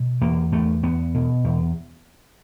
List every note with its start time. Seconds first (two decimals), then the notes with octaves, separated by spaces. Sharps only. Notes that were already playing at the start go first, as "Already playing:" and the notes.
Already playing: B2
0.21 E2 A#3
0.52 E2 A3
0.83 E2 B3
1.14 B2
1.44 E2